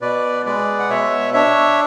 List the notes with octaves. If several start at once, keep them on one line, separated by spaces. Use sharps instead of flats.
B2 B4 D5
G#3 B4 D5
F#5
B2 C#5 E5
D4 C#5 E5